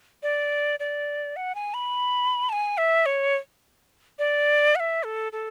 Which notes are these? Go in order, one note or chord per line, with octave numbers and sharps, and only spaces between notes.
D5
D5
F#5
G#5
B5
A5
G#5
E5
C#5
D5
F#5
E5
A4
A4